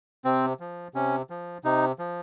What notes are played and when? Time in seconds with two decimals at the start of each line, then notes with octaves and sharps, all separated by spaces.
0.25 C3 C4
0.60 F3
0.94 C3 C#4
1.30 F3
1.64 C3 D#4
1.99 F3